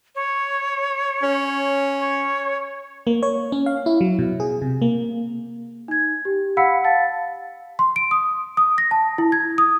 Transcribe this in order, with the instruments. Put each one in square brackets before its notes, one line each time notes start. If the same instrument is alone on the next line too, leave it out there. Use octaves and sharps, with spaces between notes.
[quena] C#5
[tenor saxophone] C#4
[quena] C#5
[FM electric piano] A#3
C#5
C#4
F5
E4
F#3
B2
G#4
C3
A#3
[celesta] D#4 G#6
G4
F5 F#5 B5 E6 B6 C#7
F5 A5 A6
C6
D7
D#6
D#6
A#6
A5
E4
G#6
D#6